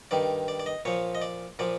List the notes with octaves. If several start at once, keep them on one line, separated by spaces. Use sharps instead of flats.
G2 D#3 D5
D5
D5
D#5
A#2 F3 C#5
D#5
D5
A#2 F3 D5